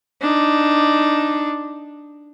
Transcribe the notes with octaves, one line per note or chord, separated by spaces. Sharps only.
D4 D#4